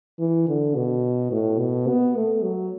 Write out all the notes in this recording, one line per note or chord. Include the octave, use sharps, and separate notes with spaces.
E3
D3
B2
A2
B2
B3
A3
F#3